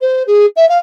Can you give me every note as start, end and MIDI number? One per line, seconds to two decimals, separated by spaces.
0.01 0.23 72
0.27 0.46 68
0.56 0.68 76
0.69 0.78 77